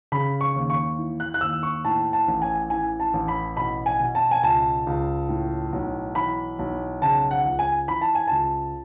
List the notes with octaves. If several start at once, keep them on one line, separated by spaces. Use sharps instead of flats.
C#3 B5
C#6
D#2
C#6
E3
F#6
F#6
D#2 E6
C#6
A2 A5
A5
A1
G#5
E3 G#5
A5
A1
B5
B2 B5
G#5
B2
A5
G#5
C#2 A5
C#2
A2
B1
E3 B5
B1
C#3 A5
F#5
C#2
G#5
E3 B5
A5
G#5
C#2 A5